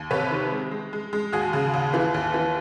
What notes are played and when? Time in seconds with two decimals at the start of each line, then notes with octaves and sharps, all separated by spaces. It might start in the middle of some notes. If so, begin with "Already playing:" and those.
Already playing: D#2
0.11 C3 B4 C#5
0.31 D#3
0.51 G#3
0.71 G#3
0.93 G#3
1.13 G#3
1.33 D#2 F#4 G#4
1.53 C#3
1.74 D#2
1.94 E3
2.14 D#2
2.34 E3